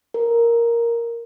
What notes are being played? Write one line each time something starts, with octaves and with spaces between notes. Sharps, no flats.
A#4